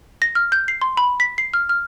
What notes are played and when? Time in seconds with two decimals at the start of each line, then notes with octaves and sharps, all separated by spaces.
0.22 A#6
0.35 F6
0.52 G6
0.68 C7
0.82 C6
0.97 B5
1.20 B6
1.38 C7
1.54 F6
1.69 F6